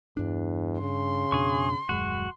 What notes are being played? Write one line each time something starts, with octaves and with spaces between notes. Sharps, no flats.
E2 G2 D4
C#3 C6
F2 B2 D4 G#4 C#6
D#1 F#2 G#3 F#4